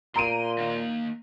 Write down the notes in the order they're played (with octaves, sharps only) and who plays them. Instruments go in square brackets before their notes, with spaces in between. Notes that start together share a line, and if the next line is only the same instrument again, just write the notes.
[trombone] A#2 [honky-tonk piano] A#5 D7 D#7 [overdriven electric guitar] C6
[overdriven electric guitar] A#3 D#5